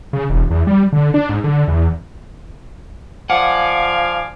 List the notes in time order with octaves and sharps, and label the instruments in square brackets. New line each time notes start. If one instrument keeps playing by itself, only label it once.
[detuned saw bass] C#3
E1
E2
G3
D3
D4
G#2
D3
E2
[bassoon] F3 [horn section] D5 F5 G#5 [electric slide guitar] F#5